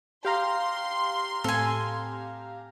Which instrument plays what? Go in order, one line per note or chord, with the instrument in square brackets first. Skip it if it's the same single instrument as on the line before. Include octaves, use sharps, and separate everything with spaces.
[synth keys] G4 F5 A#5 [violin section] C6
[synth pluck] A2 C4 [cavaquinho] A4 G#5